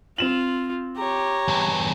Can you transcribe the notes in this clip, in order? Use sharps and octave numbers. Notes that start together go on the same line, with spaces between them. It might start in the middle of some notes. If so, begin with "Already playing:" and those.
C4 F4 E7 F#7
G4 C#5 A#5
E2 G2